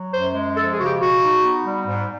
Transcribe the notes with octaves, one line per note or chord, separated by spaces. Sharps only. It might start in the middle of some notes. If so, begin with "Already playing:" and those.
Already playing: F#3
F#2 C5
G#3
F3 A4
G#4
C#3 F#4
G4
B2 F#4
D#4
B3
G3
G#2